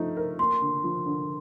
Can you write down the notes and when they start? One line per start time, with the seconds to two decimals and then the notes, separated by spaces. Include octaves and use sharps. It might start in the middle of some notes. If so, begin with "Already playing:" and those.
Already playing: F3 A3 D#4
0.17 A#4
0.39 A#3 C6
0.61 D3
0.84 F3
1.06 D3